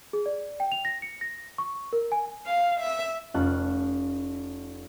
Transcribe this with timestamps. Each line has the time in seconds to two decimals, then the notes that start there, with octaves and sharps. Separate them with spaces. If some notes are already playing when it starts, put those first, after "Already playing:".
0.13 G#4
0.26 D5
0.60 G5
0.72 F7
0.85 A#6
1.02 C#7
1.21 A#6
1.58 C#6
1.93 A#4
2.12 G#5
2.46 F5
2.78 E5
3.34 F1 C#4 F4 A5 F#6